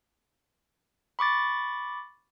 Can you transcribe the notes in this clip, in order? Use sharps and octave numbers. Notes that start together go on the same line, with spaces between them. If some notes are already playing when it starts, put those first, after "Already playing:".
B5 C#6 D6 A6